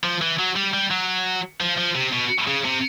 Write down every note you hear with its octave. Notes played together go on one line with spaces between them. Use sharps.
F3
E3
F#3
G3
G3
F#3
F3
F3
C3
B2
C#3
C3